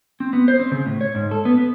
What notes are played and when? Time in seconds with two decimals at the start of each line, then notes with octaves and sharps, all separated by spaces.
0.20 C4
0.33 B3
0.48 C5
0.60 C4
0.72 C#3
0.86 A2
1.01 C#5
1.15 G#2
1.31 A4
1.45 B3
1.58 B3